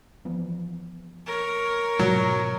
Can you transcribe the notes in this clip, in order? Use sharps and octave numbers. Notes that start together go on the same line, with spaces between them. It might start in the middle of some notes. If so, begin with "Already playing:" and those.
E3 F3 B3
A#4 C#5
G#2 B2 D3 F#3